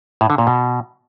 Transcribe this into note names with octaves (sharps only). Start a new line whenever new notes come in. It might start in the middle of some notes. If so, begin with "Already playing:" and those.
A2
D3
A#2
B2